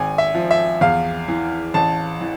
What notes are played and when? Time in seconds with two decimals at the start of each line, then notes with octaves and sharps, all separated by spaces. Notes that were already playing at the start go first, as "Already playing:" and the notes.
Already playing: G#1 G#5
0.18 E5
0.35 F3
0.51 E5
0.81 E2 F5
1.28 E3
1.74 A1 A5
2.21 E3